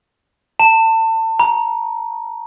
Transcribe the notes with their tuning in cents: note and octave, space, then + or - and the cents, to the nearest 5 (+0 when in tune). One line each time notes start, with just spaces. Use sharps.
A5 +35
A#5 +30